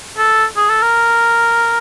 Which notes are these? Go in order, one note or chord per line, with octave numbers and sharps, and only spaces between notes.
A4
G#4
A4
A#4